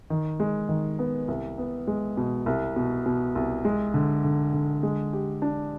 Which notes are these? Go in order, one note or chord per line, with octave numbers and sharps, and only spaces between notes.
D#3
G#3
D#3
B3
C2
B3
G#3
B2
C2
B2
B2
C2
G#3
D3
D3
D3
G#3
G4
D4